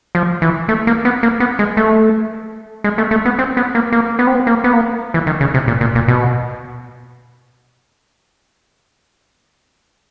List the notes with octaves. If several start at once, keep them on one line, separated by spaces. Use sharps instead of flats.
F3
E3
A3
A#3
B3
A#3
B3
G#3
A3
G#3
A3
A3
B3
C4
B3
A#3
A#3
B3
C4
B3
A#3
B3
A#3
E3
D#3
C#3
C3
A#2
A#2
A#2
B2